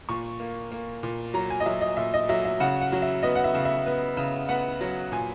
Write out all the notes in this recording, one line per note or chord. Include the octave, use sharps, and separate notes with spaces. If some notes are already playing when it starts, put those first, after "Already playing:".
A#2 C#6
A#3
A#3
A#2
F#3 A#5
G#5
D#5
F#3 E5
D#5
A#2 E5
D#5
F#3 E5
E5
C#3 F#5
F#5
F#3
E5
B3 D#5
F#5
E5
C#3
E5
B3
C#3
B3 F#5
F#3
A#2 G#5